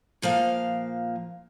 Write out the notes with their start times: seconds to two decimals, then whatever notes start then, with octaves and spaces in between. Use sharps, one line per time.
0.22 A#2 F3 A#3 F5